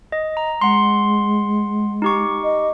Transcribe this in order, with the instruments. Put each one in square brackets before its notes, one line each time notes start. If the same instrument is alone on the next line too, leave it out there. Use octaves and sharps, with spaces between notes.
[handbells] D#5
A#5
[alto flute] G#3 [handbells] F#5 C6
[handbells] D#4 G4 C#6
[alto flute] D#5